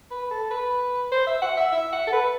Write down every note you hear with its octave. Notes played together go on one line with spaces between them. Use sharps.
B4
A4
B4
C5
E5
F#5
E5
E5
F#5
A4
B4